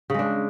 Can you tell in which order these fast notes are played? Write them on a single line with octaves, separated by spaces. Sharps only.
C#3 G#3 D4